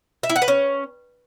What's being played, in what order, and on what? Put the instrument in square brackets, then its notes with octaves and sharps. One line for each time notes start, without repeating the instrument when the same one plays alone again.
[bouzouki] E5
E4
F#5
B4
C#4